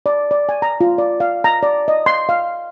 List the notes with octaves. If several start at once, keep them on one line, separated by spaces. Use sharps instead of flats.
D5
D5
G#5
A#5
F4
D5
F5
A#5
D5
D#5
C6
F5